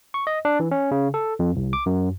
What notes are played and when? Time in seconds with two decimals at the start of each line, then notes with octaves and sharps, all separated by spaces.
0.14 C#6
0.27 D#5
0.45 D4
0.60 E3
0.71 C#4
0.91 C#3
1.14 A4
1.39 F2
1.56 C2
1.73 D6
1.86 F#2